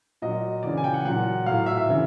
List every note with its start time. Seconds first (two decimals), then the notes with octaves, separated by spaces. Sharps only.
0.22 A#2 F#3 D#5
0.63 C#3 E3 D5
0.78 G#5
0.84 G5
0.94 F#5
1.05 A#2 F#3 F#5
1.46 A2 F#3 F5
1.66 E5
1.77 E5
1.88 C#3 E3